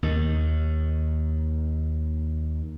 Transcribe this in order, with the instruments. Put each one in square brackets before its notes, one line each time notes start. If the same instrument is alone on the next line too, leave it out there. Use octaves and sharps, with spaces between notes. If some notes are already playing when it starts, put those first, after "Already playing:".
[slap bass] D#2 D#3